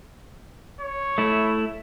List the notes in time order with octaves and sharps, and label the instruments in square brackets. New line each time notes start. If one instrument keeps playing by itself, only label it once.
[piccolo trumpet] C#5
[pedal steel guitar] A3 E4